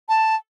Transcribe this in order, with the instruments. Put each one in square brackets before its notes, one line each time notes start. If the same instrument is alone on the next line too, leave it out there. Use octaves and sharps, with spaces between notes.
[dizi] A5